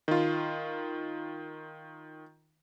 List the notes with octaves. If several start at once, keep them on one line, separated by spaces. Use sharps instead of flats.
D#3 F4